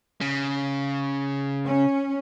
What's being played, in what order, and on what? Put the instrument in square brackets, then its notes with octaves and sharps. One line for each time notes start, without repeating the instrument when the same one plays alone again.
[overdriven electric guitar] C#3
[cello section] C#4